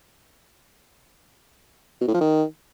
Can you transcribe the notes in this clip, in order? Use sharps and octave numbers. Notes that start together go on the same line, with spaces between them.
B2
A2
F3
D#3